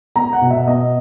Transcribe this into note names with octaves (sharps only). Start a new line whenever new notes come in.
B3 A#5
F#5
B2
E5
B3 D#5